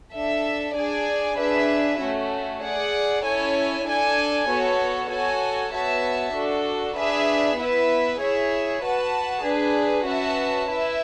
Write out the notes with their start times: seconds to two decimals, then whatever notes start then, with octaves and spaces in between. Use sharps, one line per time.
0.13 D4 A4 E5
0.76 D4 G#4 D5 G#5
1.37 D4 G#4 B4 E5
2.00 A3 C#4 F#4
2.62 G#4 D5 F#5
3.23 C#4 E4 A4 C#5 G#5
3.86 D4 A4 D5 G#5
4.48 B3 F#4 A4 C#5
5.10 F#4 A4 C#5 G#5
5.72 B3 F#4 C#5 E5 A5
6.34 D4 F#4 A4
6.96 D4 G#4 B4 E5
7.58 B3 E4 B4 E5
8.21 E4 G#4 C#5 E5
8.83 F#4 B4 F#5 A5
9.44 D4 G#4 B4
10.06 C#4 F#4 B4 E5 A5
10.69 E4 B4 E5